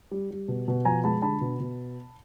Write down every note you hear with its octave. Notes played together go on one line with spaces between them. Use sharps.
G3
G3
B2
B2
F3 G#5 A#5
G#3 A5 B5
D3 A5 B5
B2
B2